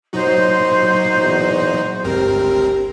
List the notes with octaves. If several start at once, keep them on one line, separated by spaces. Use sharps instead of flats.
A#2 F#3 D#4 F#4 C5
E2
G1 C#2 C4 G4 A#4